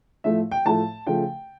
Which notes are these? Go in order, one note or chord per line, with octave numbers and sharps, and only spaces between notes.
A2 F3 A3 E5
G5
A2 F3 A3 A5
C#3 F3 A3 G5